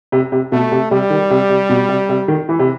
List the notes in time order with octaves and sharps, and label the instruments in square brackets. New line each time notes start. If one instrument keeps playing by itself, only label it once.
[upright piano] C3
C3
[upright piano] B2 [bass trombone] A3
[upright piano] C3
[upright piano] C3 [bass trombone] G3
[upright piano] D#3
C3
C3
B2
C3
C3
D#3
E3
C3